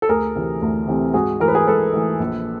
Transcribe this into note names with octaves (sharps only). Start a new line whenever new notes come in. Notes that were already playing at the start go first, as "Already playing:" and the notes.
A4
D2 G#4 A#4
C3 E3 A3 C4
D2
C3 E3 A3 C4
G#2 F#4 G#4
E3 A3 A#4
B4
G#4 A#4
G#2 A4 B4
E3 A3
A#1